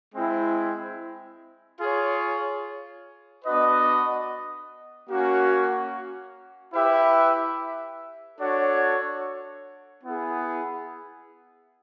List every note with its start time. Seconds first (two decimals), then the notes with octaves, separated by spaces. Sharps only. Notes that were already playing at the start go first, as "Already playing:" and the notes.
0.14 G#3 C4 E4
1.78 F4 G#4 C#5
3.44 B3 D4 F#4 B4 D#5
5.08 A#3 C#4 F#4
6.73 E4 G4 B4 E5
8.39 D4 F#4 A4 C#5
10.03 B3 E4 G#4